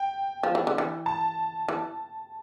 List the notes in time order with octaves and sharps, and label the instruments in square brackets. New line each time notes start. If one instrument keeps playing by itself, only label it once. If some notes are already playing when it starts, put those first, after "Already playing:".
Already playing: [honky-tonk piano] G5
[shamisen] F3
E3
D3
E3
[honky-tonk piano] A5
[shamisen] E3